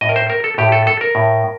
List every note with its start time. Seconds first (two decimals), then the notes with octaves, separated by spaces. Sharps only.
0.01 A2 D#5
0.09 A#4
0.16 C5
0.30 A#4
0.44 A4
0.58 A2 G4
0.72 A4
0.87 A4
1.01 A#4
1.15 A2